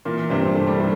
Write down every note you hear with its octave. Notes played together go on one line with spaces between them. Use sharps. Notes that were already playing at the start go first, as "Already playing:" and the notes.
A#2 E3 A#3
G2 C3 C4
G2 A3
G3
A2 A3